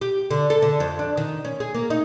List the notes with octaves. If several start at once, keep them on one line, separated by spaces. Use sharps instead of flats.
G4
D3
A4
D3
F2
D4
D#3
C#4
G#4
A#3
D#4